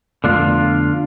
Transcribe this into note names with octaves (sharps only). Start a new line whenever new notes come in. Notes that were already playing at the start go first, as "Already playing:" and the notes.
F2 D3 A3 B3 D4 F4